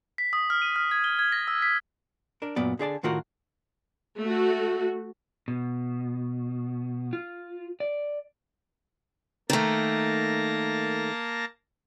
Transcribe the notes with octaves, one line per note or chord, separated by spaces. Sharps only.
B6
D#6
F6
D#7
F6
G#6
G7
G#6
A#6
E6
B6
D4 A#4
F#2 A#2 B3 D5
D3 G#4 D5 A5
A2 D#3 F4 F#4 A#4 F#5
A3 F#4
B2
F4
D5
D#3 A3 A#3 A5 A#6